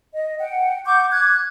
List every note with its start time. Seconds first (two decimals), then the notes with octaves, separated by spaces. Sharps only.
0.15 D#5
0.39 F#5 G5
0.85 F#5 C#6 D6 G6
1.11 D6 F#6 G#6